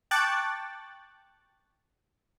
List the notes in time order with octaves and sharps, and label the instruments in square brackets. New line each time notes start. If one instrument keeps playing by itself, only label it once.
[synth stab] G5 A5 C#6 D6 F#6 A6